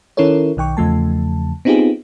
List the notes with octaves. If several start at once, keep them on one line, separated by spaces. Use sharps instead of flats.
D#3 C#4 E4 A4 A#4 C#5
B1 D#3 G5 C#6
E2 C#3 F3 A3 A5
B3 C4 D#4 F4 G4 G#4